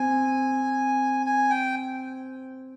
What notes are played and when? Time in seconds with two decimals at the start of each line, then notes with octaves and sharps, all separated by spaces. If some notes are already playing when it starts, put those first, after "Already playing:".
Already playing: C4 G#5
1.26 G#5
1.50 G5